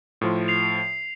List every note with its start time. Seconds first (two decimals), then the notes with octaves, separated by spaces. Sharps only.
0.21 A2 F3 C6
0.48 C7 F7